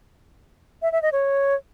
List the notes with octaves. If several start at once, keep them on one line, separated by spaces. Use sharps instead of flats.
E5
E5
D#5
C#5